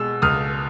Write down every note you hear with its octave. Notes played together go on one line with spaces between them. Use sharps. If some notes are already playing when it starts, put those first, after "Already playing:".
Already playing: B2 G#3 E6
C#2 D#6 F6